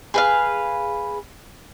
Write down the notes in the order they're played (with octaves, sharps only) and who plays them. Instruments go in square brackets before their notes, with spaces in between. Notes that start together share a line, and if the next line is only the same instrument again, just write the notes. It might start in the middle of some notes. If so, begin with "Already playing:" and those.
[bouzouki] G#4 B4 F5